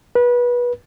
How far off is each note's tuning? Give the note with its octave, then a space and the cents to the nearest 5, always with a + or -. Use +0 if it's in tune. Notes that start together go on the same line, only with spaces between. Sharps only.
B4 -25